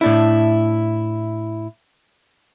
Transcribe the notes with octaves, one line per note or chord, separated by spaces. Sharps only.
A2 D4 E4